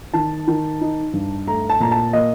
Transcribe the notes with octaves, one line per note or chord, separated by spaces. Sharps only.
D#3 A5
D#3
D#4
G2
A3 A#5
A5
A#2 A#5
A5
A#3 D#5